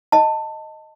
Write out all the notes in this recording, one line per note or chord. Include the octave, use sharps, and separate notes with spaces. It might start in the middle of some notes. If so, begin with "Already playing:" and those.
D#5 A5